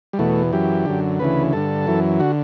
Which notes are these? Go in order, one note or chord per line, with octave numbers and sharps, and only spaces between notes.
G3
E2 B2 A3
F#2 E3 G4
F#2 D3
D2 C#3 E3 B4
G2 D3 A4
F#2 E3
D3 F#4